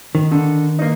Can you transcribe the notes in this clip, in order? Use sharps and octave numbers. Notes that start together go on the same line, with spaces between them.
D#3
D3
A#3 D#4